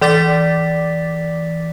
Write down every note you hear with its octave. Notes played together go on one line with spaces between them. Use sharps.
E3 D5 D6 A6 B6